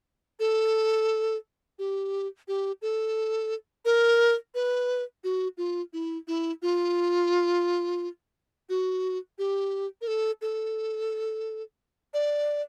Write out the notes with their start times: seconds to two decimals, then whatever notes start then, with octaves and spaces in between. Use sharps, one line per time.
0.40 A4
1.79 G4
2.48 G4
2.82 A4
3.85 A#4
4.55 B4
5.24 F#4
5.57 F4
5.93 E4
6.28 E4
6.62 F4
8.69 F#4
9.38 G4
10.01 A#4
10.07 A4
10.42 A4
12.14 D5